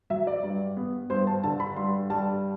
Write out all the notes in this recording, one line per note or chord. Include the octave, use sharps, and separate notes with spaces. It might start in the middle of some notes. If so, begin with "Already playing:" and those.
F#3 E5
D5
G2
B3
G2 C5
A5
D3 A5
B5
G2 C6
G3 A5